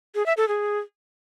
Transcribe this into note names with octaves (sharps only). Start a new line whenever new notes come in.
G#4
E5
A4
G#4